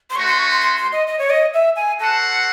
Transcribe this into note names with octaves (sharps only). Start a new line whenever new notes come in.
C6
A3 C#4 F#4 C#6
C6
C#6
C6
C6
C6
D#5
D#5
C#5
D#5
E5
G#5
F#4 A4 C5 F#5 A5